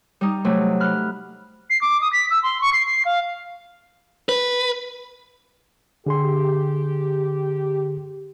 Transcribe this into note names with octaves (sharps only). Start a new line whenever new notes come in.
G3 D#4
C3 F#3 A3
B5 F6 F#6
C7
D6
D#6
B6
E6
C6
C#6
C7
C7
F5
B4
D3 G4 G#4 C6